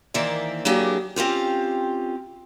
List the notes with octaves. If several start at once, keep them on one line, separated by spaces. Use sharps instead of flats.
D#3 E3 A#3 C5 D5 E5
F#3 A#3 D4 E4 G4 G#4
C4 C#4 F4 G4